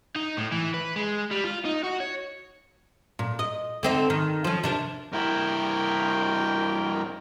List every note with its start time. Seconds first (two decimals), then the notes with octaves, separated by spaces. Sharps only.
0.16 D#4
0.37 A2
0.52 E3
0.74 B4
0.96 G#3
1.31 G3
1.44 F4
1.65 D#4
1.83 F#4
2.00 C#5
3.19 A#2
3.39 D#5
3.83 D3 C4 D#4
4.10 D#3
4.44 F3 C#4
4.63 C3 D4 A#4
5.13 G2 E4 A#4 G5